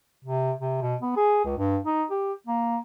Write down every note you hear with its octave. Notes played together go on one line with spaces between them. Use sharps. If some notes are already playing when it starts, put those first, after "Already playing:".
C3
C3
B2
B3
G#4
C#2
G2
D#4
G4
A#3